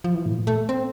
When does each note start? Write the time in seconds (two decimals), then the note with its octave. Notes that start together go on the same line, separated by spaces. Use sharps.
0.04 F3
0.15 E3
0.26 A2
0.37 A#2
0.47 A3
0.69 C4